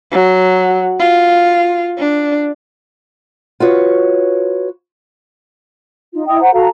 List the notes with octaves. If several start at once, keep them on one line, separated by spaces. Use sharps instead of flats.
F#3
F4
D4
F4 F#4 B4 C#5
D#4 F4
E4 D#5 G5 D#6
C5 F#5 A#5
F#4 A4 F5 A#5